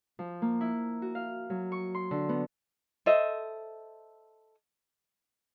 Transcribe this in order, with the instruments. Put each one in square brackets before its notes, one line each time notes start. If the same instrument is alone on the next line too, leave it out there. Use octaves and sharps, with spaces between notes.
[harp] F3
A#3
E4
F#4
F5
F#3
C#6
C6
D3
B3
[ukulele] A4 C5 D#5 E5